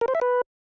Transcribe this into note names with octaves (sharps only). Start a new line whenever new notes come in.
A#4
C5
E5
B4